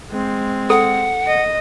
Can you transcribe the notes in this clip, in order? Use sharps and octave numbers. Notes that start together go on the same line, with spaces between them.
G#3 C4
A4 F#5
D#5